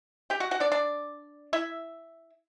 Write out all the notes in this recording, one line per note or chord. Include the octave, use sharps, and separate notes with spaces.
G4 G5
F#4 F#5
F#4 F#5
D4 D5
D4 D5
E4 E5